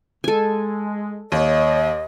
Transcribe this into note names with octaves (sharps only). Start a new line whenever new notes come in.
G#3 A4 G#5
D#2 C#5 D#5